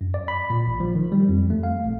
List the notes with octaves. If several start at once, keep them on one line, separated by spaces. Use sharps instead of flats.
F#2
D5
B5
A#2
A1
F3
D#3
G3
F2
A3
F5
A#1